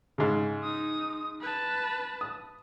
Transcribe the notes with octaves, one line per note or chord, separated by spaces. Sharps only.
G#2 C#3
D#4 D#6
B4 A5
D#6